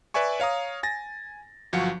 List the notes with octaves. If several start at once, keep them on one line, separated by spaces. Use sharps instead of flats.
B4 D5 E5 G#5 C#6
C#5 F5 A#5 D#6
G#5 A6 A#6
G1 F3 F#3 F#4 F5 C#7